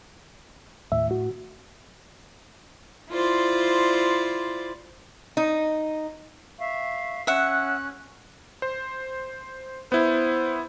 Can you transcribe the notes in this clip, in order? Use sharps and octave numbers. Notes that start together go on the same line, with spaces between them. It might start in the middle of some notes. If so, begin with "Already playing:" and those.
D#2 A2 E5
F#4
E4 F4 C5 D5
D#4
E5 F5 C#6
C#4 E5 F#5 F#6
C5
B3 E4 C5